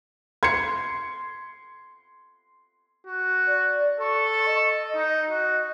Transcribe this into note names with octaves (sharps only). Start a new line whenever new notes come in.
C6 G#6 C#7
F#4
D5
A4 C#6
D#5
D#4
F#4